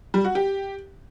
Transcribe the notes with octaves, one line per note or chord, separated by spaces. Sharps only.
G3
F#4
G4